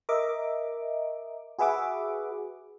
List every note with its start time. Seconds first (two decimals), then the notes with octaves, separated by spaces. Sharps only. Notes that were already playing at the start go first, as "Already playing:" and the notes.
0.09 A#4 D#5 E5 D6
1.59 F#4 G#4 B4 E5 F#5 D6